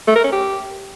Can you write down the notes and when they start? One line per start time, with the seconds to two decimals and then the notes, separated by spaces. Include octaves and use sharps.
0.08 A3
0.16 A#4
0.24 C#4
0.32 G4